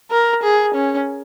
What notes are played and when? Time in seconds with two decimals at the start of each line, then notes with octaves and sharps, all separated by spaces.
0.11 A#4
0.43 G#4
0.75 C#4